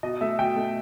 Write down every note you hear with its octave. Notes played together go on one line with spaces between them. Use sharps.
B2 D#5
A3 E5
B2 G5
A3